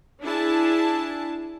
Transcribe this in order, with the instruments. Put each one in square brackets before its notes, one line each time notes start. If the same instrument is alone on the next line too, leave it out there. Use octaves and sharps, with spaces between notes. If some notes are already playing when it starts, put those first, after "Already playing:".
[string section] D4 E4 G#4 A5